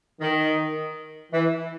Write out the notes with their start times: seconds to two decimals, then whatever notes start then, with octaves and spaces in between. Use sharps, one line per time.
0.21 D#3
1.32 E3